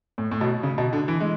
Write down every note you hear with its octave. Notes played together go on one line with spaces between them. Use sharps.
A2
A2
B2
C#3
B2
D3
E3
G#3